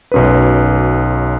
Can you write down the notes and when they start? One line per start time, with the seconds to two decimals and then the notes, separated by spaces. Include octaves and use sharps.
0.12 B1 F#2 B4